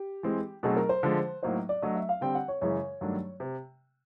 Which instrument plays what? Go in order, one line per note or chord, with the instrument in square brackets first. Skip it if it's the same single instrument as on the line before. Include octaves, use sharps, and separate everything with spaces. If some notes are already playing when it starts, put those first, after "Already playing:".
Already playing: [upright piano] G4
[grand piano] E3 G#3 C4
[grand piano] B2 F#3 A3 C4 D#4 [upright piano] G#4
[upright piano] A#4
C5
[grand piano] D3 F3 G#3
[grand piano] A2 F#3 A#3 D#4 [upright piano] C5
[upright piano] D5
[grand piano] F#3 A3 D4 [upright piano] D#5
[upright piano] E5
F5
[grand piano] D3 G3 C4 [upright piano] G5
[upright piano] F#5
C#5
[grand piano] F#2 C#3 E3 G#3 [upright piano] C#5
[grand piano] G2 D#3 F#3 A3 D4
C3